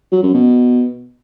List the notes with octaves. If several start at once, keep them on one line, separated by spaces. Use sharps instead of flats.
F#3
F#2
B2